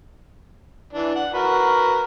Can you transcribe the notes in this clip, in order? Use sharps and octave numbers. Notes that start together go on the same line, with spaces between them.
E3 D4
F#5
F#4 A#4 B4